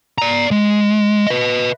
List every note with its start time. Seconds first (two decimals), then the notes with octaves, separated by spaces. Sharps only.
0.18 D5 A#5
0.51 G#3
1.27 B4 D#5